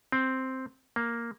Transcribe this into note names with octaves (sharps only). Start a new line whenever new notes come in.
C4
A#3